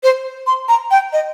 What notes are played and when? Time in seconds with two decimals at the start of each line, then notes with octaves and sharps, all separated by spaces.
0.03 C5
0.47 C6
0.69 A#5
0.91 G5
1.13 D#5